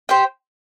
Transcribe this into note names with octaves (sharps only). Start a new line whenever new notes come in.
G4 C5 G5